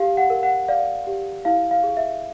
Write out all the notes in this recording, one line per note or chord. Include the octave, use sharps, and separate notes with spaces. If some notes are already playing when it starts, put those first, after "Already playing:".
Already playing: G4 F5
F#5
A#4
F#5
D5 F5
G4
E4 F5
F5
G#4
E5